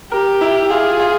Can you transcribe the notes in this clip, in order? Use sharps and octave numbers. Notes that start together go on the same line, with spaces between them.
G4 A#4
E4
F4 G#4
F4